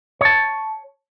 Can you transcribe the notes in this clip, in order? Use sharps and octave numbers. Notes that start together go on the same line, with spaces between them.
C#5 A5